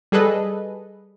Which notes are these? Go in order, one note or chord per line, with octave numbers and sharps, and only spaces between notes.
G3 G#4 A4 B4 D#5